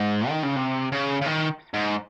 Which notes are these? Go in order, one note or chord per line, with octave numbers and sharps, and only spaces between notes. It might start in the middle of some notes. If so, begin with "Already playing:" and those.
Already playing: G#2
D#3
C#3
C3
C#3
C#3
D#3
G#2